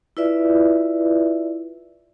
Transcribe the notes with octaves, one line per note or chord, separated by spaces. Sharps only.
E4 F4 B4 D5 E5